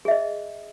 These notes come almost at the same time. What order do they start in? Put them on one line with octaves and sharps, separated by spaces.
G#4 E5 D#5